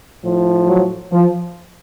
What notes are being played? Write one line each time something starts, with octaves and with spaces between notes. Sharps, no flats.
A2 F3
F#3
F3